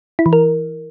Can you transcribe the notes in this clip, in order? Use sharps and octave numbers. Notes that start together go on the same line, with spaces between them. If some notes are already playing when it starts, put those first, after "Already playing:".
E4
E3
A#4